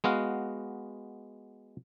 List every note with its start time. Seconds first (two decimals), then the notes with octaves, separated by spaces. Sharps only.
0.04 G#3 B3 F#4 F5